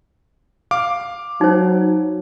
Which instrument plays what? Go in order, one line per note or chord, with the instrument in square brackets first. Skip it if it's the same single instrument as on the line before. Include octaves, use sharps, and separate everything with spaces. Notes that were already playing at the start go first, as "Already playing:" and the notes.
[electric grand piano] F5 D6
[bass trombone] F#3 [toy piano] D#4 C5